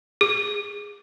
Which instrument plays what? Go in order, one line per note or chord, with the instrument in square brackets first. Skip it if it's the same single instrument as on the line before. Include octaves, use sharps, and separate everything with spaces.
[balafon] G#4